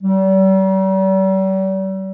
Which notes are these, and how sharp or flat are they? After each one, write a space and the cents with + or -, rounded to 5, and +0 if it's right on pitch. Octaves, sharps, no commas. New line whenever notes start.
G3 -45